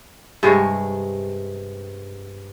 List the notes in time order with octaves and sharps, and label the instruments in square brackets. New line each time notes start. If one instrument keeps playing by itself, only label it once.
[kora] G2 C3 G#3 C#5